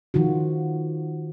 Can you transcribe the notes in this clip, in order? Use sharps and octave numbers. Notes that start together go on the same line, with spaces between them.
D#3 F3 F4 F#4